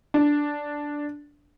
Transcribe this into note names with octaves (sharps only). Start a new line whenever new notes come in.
D4